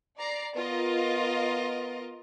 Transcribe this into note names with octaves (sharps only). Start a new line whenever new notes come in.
D5 A#5 C7
B3 F4 A#4 D#5